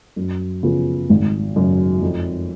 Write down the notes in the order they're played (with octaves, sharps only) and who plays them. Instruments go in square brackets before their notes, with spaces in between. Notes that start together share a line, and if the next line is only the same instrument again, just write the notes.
[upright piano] F#2
C#3 F3 B3 F4
G#1
F#2 C#3 F#3
F2